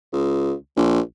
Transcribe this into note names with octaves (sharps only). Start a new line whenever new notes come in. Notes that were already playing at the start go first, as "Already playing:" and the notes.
C#2
A#1